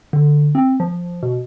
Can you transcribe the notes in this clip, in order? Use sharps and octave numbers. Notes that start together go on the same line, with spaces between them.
D3
C4
F3
B2